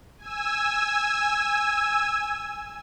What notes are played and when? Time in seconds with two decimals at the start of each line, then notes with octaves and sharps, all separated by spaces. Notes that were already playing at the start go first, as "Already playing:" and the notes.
0.18 G#5 E6